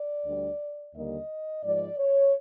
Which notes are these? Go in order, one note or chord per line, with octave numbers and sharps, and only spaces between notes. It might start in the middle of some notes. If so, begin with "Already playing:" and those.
Already playing: D5
D2 D3 G3
D#2 D3 G3 A#3 D#5
G#2 F3 G#3 D5
C#5